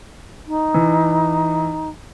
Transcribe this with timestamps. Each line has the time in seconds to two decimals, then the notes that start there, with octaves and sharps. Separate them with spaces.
0.47 D#4
0.74 E3